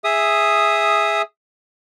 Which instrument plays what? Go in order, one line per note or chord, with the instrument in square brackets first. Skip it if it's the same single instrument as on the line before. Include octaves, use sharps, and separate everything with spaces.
[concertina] G#4 E5 D#6